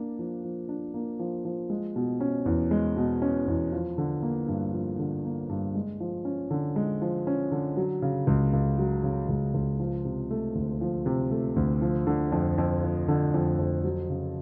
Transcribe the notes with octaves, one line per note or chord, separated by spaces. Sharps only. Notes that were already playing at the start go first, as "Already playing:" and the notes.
Already playing: A#3 D4
F3
F3
D4
A#3
F3
F3
G#3
B2
C#4
E2
G#3
B2
C#4
E2
F3
D3
A#3
G2
F3
D3
A#3
G2
G#3
F3
C#4
D3
G#3
F3
C#4
D3
F#3
C#3
C#2
C#2
F#3
C#3
C#2
C#2
F3
C3
A3
D2
F3
C3
A3
D2
F3
D3
F2
F2
F3
D3
F2
F2
F#3
C#3